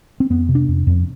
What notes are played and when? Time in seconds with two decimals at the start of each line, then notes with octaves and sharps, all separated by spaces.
0.20 C4
0.30 F2 B3
0.49 C3
0.55 D4
0.68 F2
0.87 F2